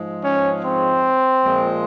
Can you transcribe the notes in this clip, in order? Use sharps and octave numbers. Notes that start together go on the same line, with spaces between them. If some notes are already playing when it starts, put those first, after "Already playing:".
Already playing: G#2 F3 G#3
C#4
C4
A#2 F3 G#3